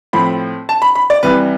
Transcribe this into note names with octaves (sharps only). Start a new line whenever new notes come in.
A2 F3 C4 B5
A5
B5
B5
D5
C2 C3 E3 G3 B4